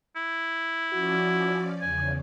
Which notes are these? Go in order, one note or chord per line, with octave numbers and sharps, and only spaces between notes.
E4
F3 C#4 F#4 D5
E2 C#3 G#5